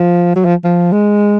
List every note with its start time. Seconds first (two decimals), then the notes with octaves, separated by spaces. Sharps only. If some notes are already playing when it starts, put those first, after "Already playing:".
Already playing: F3
0.36 F#3
0.45 F3
0.64 F3
0.92 G#3